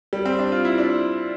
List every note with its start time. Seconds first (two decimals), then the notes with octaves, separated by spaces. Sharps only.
0.13 G3
0.26 C4
0.39 D4
0.52 F4
0.65 E4
0.78 D4